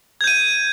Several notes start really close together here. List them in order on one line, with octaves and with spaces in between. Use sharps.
G#6 G6 D#7